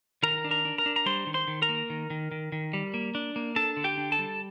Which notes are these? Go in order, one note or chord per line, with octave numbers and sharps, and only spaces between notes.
D#3 A#4 A#5
D4
A#4 A#5
D4
A#4 A#5
D4
A#5
G3 C5 C6
D#3
C5 C6
D#3
A#4 A#5
A#3
D#3
D#3
D#3
D#3
G3
A#3
D4
A#3
D4 A4 A5
D3
G4 G5
D4
A4 A5
G3